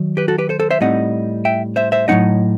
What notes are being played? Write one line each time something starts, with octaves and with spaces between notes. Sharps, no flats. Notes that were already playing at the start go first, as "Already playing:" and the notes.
Already playing: D#3 F#3
G4 B4
F#4 A4
G4 B4
A4 C5
A4 C5
C5 E5
A2 G3 C4 D#4 D#5 F#5
E5 G5
C5 E5
C5 E5
A2 F#3 C4 D#4 D#5 F#5